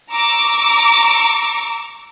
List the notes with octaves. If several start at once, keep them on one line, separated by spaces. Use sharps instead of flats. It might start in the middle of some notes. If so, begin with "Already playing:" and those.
A#5 C#6 D6 E6